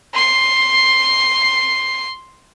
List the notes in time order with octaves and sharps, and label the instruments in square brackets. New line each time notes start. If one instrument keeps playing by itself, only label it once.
[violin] C6 C7